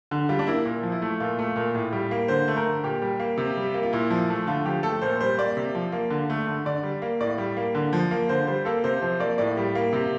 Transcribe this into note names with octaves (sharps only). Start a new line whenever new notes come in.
D3
G3 F4
D4
A#3 E4
A#2
F3
E4
A3
A#2 F4
A3
A#2
A2
G3
A#3
D3 C5
A3
A#4
D3
A#2 G4
G3
A#3
C3
G3
A#3
F4
A#2 E4
F3
A3
D3 F4
F3 G4
A3 A4
A#2 C5
G3 C5
A#3 D5
C3
F3
A#3
D3
A3
D3
D3 D5
G3
A#3
A2 D5
G3
A#3
D3
F3
A#3
D3 C5
G3 C5
A#3 A4
C3 C5
F3 C5
A#3 D5
A2 D5
G3
A#3
C3